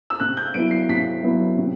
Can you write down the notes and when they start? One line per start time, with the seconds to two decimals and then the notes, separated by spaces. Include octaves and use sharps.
0.10 E6
0.20 C3 F#6
0.37 G6
0.54 F#3 B3 E4 D7
0.71 C7
0.89 C3 B6
1.23 F#3 B3 E4
1.58 C3